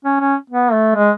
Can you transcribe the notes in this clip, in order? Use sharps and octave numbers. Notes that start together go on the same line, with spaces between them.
C#4
C#4
B3
A3
G#3